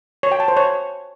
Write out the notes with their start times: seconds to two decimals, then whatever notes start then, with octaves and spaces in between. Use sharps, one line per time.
0.23 C#5
0.32 G5
0.40 A5
0.48 C5
0.57 C#5